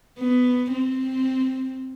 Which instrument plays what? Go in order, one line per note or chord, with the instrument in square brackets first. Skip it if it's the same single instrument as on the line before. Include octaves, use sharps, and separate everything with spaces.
[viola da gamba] B3
C4